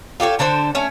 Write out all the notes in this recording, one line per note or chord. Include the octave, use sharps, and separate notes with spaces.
F4 G4 A4 C#5
D3 D4 A4 C5
A3 C#4